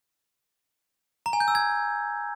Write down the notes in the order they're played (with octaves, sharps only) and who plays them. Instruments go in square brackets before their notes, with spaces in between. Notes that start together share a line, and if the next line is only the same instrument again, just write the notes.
[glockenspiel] A#5
G#5
G6
E6
G#6